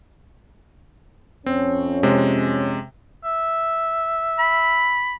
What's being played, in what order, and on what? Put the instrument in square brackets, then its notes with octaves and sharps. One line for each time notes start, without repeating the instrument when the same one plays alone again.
[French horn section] F2 C#4 C#5 [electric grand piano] C4
[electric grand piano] C3 G#3
[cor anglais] E5
[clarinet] B5